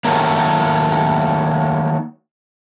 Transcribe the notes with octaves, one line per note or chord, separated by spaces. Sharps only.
D#3 F#3 A3 A#3